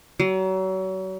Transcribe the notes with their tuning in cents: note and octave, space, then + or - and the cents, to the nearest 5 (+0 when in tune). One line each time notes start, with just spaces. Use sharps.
F#3 +35